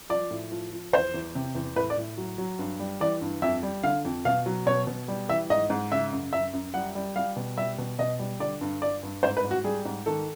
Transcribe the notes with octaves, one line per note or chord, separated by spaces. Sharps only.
F3 D5
A2
F3
F3
E2 C5
E2
C3
E2
A2 B4
D5
A2
F#3
F#3
G2
G3
E3 D5
G2
F2 E5
G3
D3 F5
F2
B2 F5
F#3
B2 C#5
B2
G3
E3 E5
G#2 D#5
G#2
C#3 E5
F#2
F#2 E5
F#2
G3 F#5
G3
G3 F5
B2
G3 E5
B2
B2 D#5
G3
D3 D5
G2
G2 D5
G2
G#2 C5
B4
G#2
F#4
G3 G#4
G#2
D#3 A4